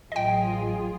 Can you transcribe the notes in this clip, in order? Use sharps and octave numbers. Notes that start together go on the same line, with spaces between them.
A1 F#3 F4 G#4 D#5 G5